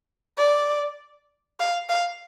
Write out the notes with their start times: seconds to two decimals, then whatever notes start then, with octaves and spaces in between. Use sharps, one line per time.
0.38 D5
1.60 F5
1.89 F5